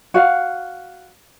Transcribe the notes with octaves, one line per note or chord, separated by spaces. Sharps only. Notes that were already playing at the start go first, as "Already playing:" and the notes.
F#4 F5